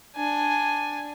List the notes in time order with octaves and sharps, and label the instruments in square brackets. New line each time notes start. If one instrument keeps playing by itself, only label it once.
[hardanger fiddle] D4 G#5